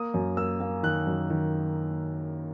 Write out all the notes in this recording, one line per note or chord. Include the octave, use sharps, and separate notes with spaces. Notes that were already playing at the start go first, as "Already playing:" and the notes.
Already playing: A#3 D#6
F#2
A#3 E6
A#3
D#3 F#6
F#2
D#3